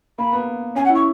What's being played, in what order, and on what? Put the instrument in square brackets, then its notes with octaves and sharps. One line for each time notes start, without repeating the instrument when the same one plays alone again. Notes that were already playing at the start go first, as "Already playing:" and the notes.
[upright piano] A#3 [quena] B5
[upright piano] B3
[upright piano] C#4 [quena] G#5
[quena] F#5
[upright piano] E4 [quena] C#6